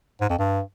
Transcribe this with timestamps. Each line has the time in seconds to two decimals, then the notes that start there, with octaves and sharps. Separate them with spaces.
0.21 G#2
0.30 F2
0.38 G2